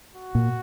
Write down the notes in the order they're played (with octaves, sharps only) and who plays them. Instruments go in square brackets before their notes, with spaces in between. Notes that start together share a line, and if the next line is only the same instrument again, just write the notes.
[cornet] F#4
[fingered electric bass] A#2